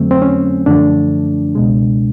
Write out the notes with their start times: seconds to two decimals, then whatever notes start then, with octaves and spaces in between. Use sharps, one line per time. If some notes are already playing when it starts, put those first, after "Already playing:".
Already playing: F2 D3 F#3 A3 C4
0.11 C4
0.22 C#4
0.66 F#2 D3 F3 A3 D4
1.55 C#2 B2 G#3